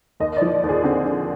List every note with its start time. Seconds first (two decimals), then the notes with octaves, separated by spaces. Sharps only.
0.20 D#2 D#5
0.37 F3 D5
0.63 D#2
0.69 G#4
0.84 D3 C4
1.05 D3